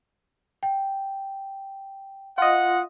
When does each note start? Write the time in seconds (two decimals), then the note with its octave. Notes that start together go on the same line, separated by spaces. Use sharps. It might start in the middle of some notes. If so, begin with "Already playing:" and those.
0.63 G5
2.38 F4 D#5 F#5